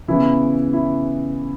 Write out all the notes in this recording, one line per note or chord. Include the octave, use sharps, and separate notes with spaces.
C#3 E3 B3 E4
E4